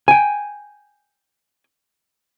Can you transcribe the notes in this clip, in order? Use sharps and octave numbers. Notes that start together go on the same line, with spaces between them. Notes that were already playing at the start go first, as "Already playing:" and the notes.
G5 G#5